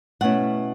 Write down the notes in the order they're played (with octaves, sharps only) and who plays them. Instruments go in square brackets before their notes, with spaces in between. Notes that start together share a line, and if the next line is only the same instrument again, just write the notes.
[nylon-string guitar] B2 A3 C#4 E4 F#5